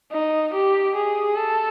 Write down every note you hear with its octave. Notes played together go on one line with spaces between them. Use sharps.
D#4
G4
G#4
A4